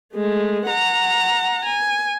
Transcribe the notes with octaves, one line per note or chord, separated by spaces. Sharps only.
G#3 A3
F#5 A#5
G#5